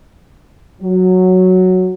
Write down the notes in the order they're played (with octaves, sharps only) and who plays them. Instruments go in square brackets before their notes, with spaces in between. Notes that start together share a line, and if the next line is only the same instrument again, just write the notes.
[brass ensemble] F#3